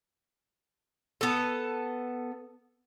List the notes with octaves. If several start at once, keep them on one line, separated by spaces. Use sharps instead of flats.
B3 A4